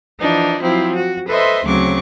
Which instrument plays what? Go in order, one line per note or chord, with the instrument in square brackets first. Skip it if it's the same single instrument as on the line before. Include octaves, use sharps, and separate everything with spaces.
[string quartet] E3 F3 D4 D#4
F3 F#3 C4 E4
F#4
A4 B4 C5 D#5 E5 C6
D2 C#3 F#3 C4 C#6 D6